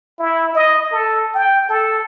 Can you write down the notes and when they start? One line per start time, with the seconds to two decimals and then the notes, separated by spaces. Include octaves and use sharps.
0.19 E4
0.55 D#5
0.92 A4
1.35 G5
1.69 A4